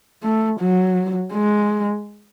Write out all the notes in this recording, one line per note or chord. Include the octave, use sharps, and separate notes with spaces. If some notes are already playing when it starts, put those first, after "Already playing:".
A3
F#3
G#3